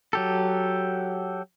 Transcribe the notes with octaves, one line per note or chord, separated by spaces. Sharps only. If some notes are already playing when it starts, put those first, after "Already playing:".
F#3 G4 A4